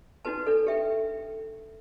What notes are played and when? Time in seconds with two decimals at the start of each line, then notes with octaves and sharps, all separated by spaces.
0.25 D4 D#4 F#4 B4 A5
0.47 D4 A4
0.67 G4 E5 G5